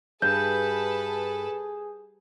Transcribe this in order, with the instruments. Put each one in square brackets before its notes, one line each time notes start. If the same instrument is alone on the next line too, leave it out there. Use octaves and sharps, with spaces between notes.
[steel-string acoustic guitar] G2 [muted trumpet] G#4 [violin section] A4 B4 A5 [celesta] G6